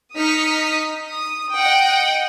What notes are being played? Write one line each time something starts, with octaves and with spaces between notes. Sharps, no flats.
D#4 D#6 F6 B6 C#7
D#6
D#5 F#5 G5